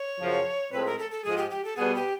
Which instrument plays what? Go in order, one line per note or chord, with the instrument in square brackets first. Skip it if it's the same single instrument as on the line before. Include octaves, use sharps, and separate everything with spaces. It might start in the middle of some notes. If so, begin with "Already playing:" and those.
Already playing: [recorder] C#5
[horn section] F#2 C#3 F3
[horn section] A2 F3 G#3 C4 [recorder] B4
[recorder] A#4
A4
A4
[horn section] G#2 F3 G#3 [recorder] G#4
[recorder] G4
G4
A4
[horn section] B2 G3 B3 [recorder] G#4
[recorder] G4